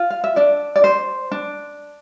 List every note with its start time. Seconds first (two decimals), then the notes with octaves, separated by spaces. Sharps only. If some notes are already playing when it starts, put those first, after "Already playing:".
Already playing: F4
0.10 F5
0.24 E5
0.36 D4 D5
0.76 D5
0.84 C5
1.31 D4